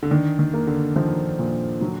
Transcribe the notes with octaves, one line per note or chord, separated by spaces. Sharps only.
D3
D#3 D4
D#3
A#3
D3
D#3 F3
A#2
F#3